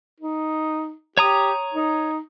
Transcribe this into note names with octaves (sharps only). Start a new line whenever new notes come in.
D#4
G4 C#5 A#5 D#6
D#4